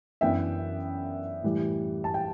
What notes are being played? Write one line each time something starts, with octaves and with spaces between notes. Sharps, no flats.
F#2 E3 B3 D4 E5 G5
A2 E3 G3
A5
G5